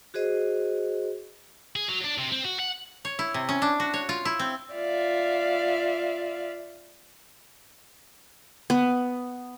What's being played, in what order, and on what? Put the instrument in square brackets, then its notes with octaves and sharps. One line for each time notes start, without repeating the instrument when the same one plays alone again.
[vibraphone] F#4 G#4 C5 D#5
[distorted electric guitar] G#4
F#3
D4
C3
C4
F#4
F#5
[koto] C#5
E4
C3
C#4
D4
F#4
C#5
F4
E4
C4
[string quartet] F4 D5 E5 F5
[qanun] B3